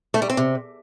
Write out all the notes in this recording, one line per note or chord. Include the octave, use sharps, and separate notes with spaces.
A3
G3
C4
C3